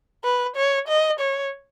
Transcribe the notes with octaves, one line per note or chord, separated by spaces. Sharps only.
B4
C#5
D#5
C#5